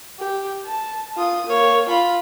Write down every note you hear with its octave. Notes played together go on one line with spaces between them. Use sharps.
G4
A5
F4 D#6
A#3 C#5
F4 B5